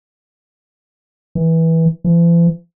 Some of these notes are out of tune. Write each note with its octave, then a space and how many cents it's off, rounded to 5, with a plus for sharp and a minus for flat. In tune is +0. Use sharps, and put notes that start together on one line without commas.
E3 -15
E3 +45